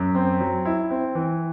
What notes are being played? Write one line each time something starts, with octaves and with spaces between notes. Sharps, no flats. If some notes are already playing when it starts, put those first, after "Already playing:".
Already playing: F#2
C4
F#3
E4
C4
E3